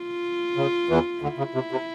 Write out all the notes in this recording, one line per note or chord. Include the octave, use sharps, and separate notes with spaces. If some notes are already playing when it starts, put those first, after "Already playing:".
Already playing: F4
C#3
E2 E3
D2 D3 E4
C#3
C3
C3